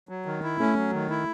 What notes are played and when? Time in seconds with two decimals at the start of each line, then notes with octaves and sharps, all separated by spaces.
0.09 F#3
0.26 D#3
0.43 E4
0.60 A3 C#4
0.76 F#3
0.93 D#3
1.10 E4